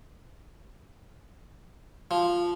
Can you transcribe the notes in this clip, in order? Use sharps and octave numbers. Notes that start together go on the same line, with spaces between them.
F3